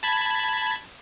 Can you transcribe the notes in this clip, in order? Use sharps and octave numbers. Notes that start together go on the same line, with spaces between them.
A5 B5 G#6